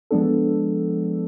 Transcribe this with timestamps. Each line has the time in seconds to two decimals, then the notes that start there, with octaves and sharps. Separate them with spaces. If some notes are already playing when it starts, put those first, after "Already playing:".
0.11 F3 G#3 B3 D4 A4